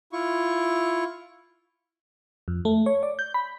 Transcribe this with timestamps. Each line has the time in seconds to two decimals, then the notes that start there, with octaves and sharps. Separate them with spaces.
0.13 E4 F4 C#6
2.48 F2
2.65 A3
2.86 C#5
3.03 D5
3.19 G6
3.34 B5